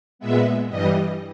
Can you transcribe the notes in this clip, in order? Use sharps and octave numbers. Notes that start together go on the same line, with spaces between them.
A#2 G#3 B3 E5
G2 E3 G3 D#5